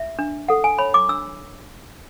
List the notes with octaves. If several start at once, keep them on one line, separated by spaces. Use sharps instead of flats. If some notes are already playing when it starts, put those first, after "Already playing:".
Already playing: E5
D4
A4 F#5
G#5
C#5 B5
D6
D4 E6